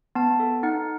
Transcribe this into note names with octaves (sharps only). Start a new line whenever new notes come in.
B3 A5
A4
D#4 F#5